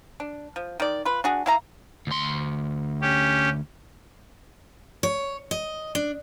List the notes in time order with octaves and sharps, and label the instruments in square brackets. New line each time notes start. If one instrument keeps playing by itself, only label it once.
[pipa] D4
F3
D#3 D5
F4 B4
D4 F#4 G#4
E4 F5 A#5
[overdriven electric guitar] D2 C6
[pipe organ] C#4 G4
[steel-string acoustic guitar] C#5
D#5
D4